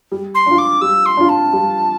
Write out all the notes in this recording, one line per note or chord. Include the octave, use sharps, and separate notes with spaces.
G3
C6
D4 F4
D6
G3 E6
C6
D4 F4
A5
G3